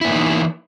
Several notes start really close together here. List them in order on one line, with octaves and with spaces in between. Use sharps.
E4 B3 A#3 D#4 E3